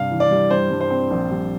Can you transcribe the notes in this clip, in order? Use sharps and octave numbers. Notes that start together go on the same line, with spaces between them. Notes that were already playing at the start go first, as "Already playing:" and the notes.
Already playing: G2 C3 F5
E3
D5
G3
G2 C5
G2
C5
C4
A#1
G3